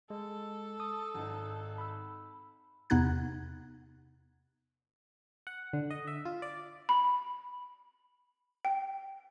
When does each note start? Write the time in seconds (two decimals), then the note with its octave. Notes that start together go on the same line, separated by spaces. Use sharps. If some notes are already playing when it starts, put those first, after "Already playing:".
0.10 G#3 A4
0.80 D#6
1.14 G#1 D#4
1.78 B5 E6
2.90 E2 C3 B3 D#4 F#6 G#6
5.47 F#5
5.73 D3
5.91 D#5
6.07 E5
6.25 F4
6.42 D5
6.89 B5
8.65 G5